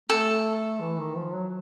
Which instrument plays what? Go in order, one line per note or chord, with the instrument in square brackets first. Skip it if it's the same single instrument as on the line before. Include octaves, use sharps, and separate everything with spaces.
[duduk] A3 [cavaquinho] A4
[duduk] E3
D#3
F3
F#3